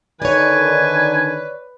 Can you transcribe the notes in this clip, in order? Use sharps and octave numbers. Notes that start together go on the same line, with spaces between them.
D3 D#3 B4 C#5 D5 G#5